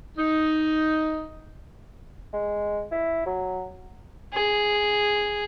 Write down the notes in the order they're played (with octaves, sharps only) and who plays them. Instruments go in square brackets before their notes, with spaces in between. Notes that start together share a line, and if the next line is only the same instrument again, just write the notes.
[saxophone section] D#4
[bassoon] G#3
E4
F#3
[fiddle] G#4